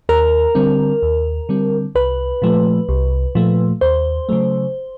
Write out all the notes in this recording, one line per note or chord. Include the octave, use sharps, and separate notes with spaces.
D#2 A#4
D3 G3 C4
D#2
D3 G3 C4
C2 B4
A#2 F3 A3
C2
A#2 F3 A3
D#2 C5
C#3 F#3 A3